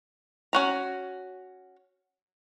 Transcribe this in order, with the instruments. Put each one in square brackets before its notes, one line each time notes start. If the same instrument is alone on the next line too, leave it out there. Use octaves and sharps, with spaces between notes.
[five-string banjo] C#4 F#4 A#5